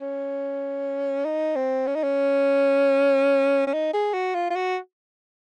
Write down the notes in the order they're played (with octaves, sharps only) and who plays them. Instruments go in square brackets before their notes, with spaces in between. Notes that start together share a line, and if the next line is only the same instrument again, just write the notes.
[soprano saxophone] C#4
D#4
C4
C#4
D#4
C#4
C#4
D#4
G#4
F#4
F4
F4
F#4